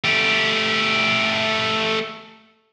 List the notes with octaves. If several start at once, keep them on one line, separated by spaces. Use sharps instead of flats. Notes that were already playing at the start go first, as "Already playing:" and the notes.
A3 G4